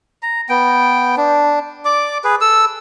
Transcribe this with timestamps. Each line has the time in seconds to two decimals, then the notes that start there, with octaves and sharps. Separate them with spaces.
0.23 A#5
0.49 B3 G5
1.17 D4
1.85 D5 D6
2.24 G#4 B4
2.41 A4 E6